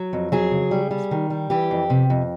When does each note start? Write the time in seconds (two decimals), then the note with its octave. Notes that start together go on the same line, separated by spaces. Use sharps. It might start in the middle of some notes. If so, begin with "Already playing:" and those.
Already playing: F#3
0.13 F2
0.32 F#3 G#4
0.51 C#3
0.71 G3
0.91 G3
1.11 D#3
1.30 G3
1.50 E3 G4
1.71 F2
1.90 C3
2.10 F2